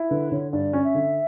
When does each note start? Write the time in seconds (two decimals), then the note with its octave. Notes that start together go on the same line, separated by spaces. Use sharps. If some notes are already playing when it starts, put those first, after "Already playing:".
Already playing: E4
0.10 D3 B4
0.32 D3 C#5
0.52 G2 D5
0.73 C#4
0.84 E5
0.95 D3